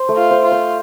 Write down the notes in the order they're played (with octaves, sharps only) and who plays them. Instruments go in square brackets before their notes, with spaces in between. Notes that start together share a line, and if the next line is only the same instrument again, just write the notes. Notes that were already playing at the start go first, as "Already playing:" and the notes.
Already playing: [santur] C5
A3
[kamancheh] F4
[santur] C5
[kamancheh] F4
[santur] C5